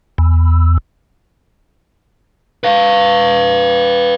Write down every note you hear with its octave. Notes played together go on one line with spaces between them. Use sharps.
E2
B4 F5